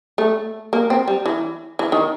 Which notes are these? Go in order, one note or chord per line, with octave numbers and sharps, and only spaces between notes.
A3
A#3
C4
G3
E3
E3
D#3